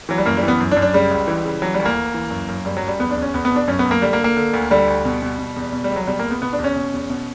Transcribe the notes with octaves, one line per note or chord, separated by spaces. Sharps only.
E3 F#3
G3
F#2 A#3
G3
E3
B3
F#2
D4
F#2
D4
C#3 G3
C#2
E3
C#3
E3 F#3
G3
D2
A#3
D2
E3
F#2
F#2
F#2 G3
F#3
F#2
G3
E2 B3
D4
E2
C#4
E2 B3
B3
B2
D4
F#2 C#4
B3
F#2
A#3
D3 G3
A#3
D3
A#3
D3
D2
D3 G3
D2
B2
B2
B2
E2
B2
G3
C#2
F#3
B2 G3
A#3
C#2
B3
B2 B3
D4
E2
C#4
B2
E2
B2